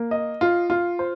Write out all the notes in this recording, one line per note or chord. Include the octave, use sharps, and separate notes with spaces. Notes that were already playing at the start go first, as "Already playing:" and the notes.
Already playing: A#3
D#5
F4
F4
C5